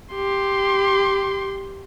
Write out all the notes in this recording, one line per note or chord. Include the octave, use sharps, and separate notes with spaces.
G4 C6